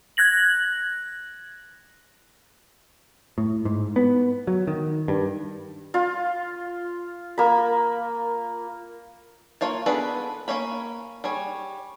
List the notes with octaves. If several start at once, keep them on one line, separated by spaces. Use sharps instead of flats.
F#6 G#6 A#6 F#7
A2
G#2
B3
F#3
D#3
G2
F4
A#3 B5
A#3 F4 C#5 A5
B3 D4 G#4 A4 B4
A#3 C#4 C#5 B5
G3 G#4 C#5